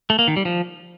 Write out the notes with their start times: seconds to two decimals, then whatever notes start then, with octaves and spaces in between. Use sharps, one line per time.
0.10 A3
0.19 A#3
0.28 D#3
0.36 G3
0.45 F3